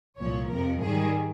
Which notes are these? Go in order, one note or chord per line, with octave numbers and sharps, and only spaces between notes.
C2 A#2 F3 C#5
F2 C3 F3 A#4
G#2 D#3 G3 G#4